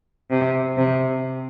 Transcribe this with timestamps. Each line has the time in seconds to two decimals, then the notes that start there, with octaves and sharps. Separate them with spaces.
0.31 C3
0.77 C3